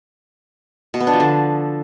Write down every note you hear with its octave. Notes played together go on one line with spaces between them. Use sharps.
B2
B3
D4
F3
D3